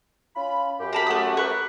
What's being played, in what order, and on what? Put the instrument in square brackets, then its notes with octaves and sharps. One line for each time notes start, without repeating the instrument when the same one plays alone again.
[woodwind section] C#4 F4 B5
F#2 G4
[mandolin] A#4 A5 B5
A3 F#5 D#6
A#4 B4 C#6